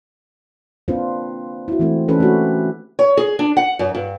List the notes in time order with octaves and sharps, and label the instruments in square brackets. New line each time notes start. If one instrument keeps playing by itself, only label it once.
[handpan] A#3 C4 D4 F4 B4 C5
E4 F#4
E3 G#3 A3 C4
E3 C#4 D4 A4 B4
A3 A#3 C4 F#4 G4
[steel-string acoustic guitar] C#5
G#4
D4
F#5
F#2
G2